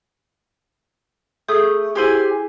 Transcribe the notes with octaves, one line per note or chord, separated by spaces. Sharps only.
A3 G#4 A4 D#6 G6
E4 G4 G#4 C5 G#5